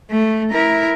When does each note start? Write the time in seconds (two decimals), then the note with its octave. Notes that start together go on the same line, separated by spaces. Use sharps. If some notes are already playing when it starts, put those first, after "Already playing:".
0.10 A3
0.51 E4 A#4